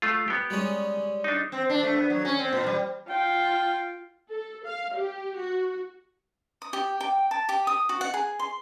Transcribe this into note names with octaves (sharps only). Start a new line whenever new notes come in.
A3 F4
B3 G4
G3 G#3 C#4
D4 D#4
C4
D4
A3
B3
F#3
C#4
C4
A#2
G3
F4 G5
A4
F5
G4
F#4
D#6
G4
G5
A5
G4
D#6
F#4
F#5
G#4
C6